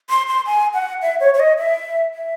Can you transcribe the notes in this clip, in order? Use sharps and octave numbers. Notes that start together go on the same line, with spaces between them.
C6
C6
G#5
F#5
E5
C#5
C#5
D#5
E5
E5